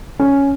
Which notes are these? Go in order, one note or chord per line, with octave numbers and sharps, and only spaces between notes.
C#4